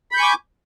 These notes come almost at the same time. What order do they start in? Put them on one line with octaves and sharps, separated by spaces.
B5 G6 C#6 G#5 D6